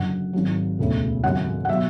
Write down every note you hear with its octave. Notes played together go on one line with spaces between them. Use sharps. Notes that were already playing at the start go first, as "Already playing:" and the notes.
Already playing: F#1 F#2 D3 F#3 F#5
G#1 G#2 F#3
E1 D2 C#3
G#1 F#2 C#3 F#5
F#5
B2 F#3 E5